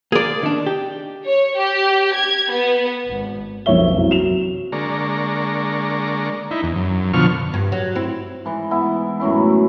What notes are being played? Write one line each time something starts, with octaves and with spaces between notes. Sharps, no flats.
A#3 G#4 D5
D#3 D4
G4
C#5
G4
G#6
B3
G#1
B1 F2 A#3 C#5 E5 G7
F#2 C3 E3
F#3 E7 F7
D3 G#3 A#3 D5 A#5 C#6
D#4 E4
E2
F#2
B2 D3 F3 C#6 F6
G2
F#3
C4 E4
G#2 E3
B3 E4
F#2 A2 C#4 E4